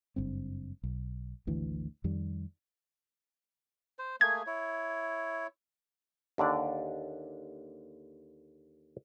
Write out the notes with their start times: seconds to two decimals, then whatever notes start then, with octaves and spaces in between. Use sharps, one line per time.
0.16 F#1 G2 C4
0.83 B1
1.47 G#1 D2 E3
2.04 F2 D#3 G3
3.99 C5
4.21 A3 A#3 G#4 G#6
4.47 E4 C#5
6.38 D#2 D3 D4 D5